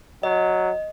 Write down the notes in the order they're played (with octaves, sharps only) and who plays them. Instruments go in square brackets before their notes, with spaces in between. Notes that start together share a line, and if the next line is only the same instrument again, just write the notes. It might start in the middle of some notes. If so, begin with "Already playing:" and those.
[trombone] F#3 [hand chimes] D#5